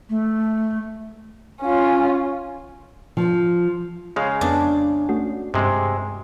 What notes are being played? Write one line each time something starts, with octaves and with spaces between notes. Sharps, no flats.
A3
C#4 F4
F3
C#3 G#3 F5
F2 B3 D4
A3 C#4 F#4
G2 C3 G#3